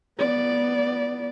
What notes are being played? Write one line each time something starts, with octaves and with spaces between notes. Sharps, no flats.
B3 D5